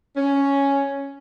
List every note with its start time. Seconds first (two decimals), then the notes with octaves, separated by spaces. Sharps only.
0.16 C#4